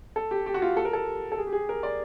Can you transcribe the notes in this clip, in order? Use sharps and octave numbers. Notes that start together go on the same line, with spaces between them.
A4
G4
G4
F#4
F4
A4
A#4
A4
A4
G#4
G4
G#4
A#4
D5